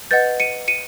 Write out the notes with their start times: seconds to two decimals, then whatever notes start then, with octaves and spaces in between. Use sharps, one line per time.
0.11 B4 D#5 F#5 G6 A6
0.40 C#7 D#7
0.68 C#7 D#7